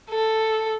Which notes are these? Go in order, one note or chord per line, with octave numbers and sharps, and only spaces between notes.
A4